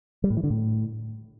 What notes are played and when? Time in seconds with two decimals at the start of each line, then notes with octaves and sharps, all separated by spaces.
0.24 G3
0.30 A2
0.37 E3
0.44 D3
0.50 A2